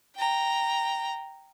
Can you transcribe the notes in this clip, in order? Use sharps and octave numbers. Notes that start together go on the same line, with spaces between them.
G5 A#5